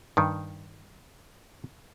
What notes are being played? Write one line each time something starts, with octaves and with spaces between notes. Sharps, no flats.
G2 D#3